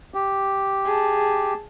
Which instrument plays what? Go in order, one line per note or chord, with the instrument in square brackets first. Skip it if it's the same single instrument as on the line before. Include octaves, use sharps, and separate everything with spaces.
[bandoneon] G4
[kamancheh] G#4 A5